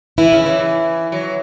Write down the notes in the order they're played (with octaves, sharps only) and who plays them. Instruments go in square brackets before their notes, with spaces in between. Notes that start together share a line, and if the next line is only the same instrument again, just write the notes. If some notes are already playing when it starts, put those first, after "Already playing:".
[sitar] E3 [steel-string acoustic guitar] E4
[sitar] C#3
E3
F#3